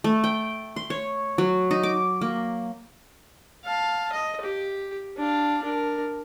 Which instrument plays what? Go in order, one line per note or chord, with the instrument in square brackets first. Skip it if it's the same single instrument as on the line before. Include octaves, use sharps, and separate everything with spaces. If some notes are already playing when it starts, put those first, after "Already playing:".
[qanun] A3
G5
C6
C#5
F#3
D#4
D6
A#3
[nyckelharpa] F5 A5
D#5
G4
D4 F5
D4 A#4